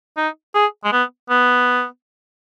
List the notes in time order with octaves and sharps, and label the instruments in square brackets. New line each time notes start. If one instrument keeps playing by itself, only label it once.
[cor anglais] D#4
G#4
G#3
B3
B3